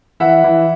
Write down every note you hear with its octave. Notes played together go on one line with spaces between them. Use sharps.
E3 E5 F#5
E3